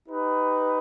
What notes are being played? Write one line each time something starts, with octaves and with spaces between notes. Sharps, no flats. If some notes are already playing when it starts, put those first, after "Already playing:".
D#4 G4 B4